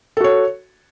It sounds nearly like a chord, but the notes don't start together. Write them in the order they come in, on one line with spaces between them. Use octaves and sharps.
A4 F#4 C#5